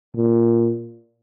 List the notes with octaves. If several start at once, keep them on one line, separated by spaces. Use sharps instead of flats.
A#2